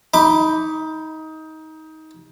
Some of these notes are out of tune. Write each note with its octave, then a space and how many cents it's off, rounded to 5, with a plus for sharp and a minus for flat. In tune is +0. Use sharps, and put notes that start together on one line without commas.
D#4 +20 B5 +0 D6 +10